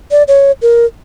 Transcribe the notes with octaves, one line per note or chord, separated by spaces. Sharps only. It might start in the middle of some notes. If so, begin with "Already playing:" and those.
D5
C#5
A#4